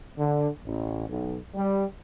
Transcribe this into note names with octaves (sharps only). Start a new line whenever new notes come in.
D3
A1
B1
G3